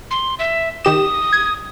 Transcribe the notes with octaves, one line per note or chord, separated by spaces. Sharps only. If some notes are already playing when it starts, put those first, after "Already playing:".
C6
E5
D#3 G4 D#6 E7
G#6